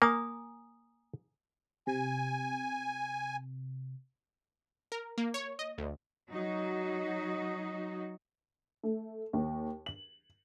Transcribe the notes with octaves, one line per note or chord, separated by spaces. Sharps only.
A#3 G#5 A#5 D#6
C3 G#5
A#4
A#3
C#5
D#5
D2
F#3 D#4 F#4
A3
D#2
F#7